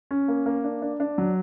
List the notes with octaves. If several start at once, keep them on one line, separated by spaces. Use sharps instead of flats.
C#4
A#3
A#3
D4
D4
D4
F#3